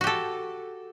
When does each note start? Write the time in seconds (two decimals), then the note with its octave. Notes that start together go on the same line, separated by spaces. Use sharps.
0.01 F#4
0.04 G4
0.07 A4